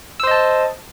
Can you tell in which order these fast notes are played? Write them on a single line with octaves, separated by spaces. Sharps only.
E6 C5 D#5 A5